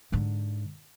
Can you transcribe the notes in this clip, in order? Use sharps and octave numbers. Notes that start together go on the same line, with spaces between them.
G#2 D3